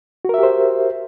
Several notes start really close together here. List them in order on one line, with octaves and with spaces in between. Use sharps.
F#4 A#4 E5 G4 C5